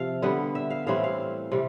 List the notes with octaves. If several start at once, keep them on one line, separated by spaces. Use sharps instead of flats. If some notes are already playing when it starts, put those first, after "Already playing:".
Already playing: C3 F3 C4 F5
D3 G3 B3
E5
F5
A2 E3 G3 C4 F5
F5
C3 G3